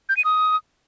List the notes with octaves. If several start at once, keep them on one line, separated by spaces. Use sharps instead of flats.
G6
D#7
D#6